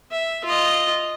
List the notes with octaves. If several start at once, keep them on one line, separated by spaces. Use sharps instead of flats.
E5
F4 D#5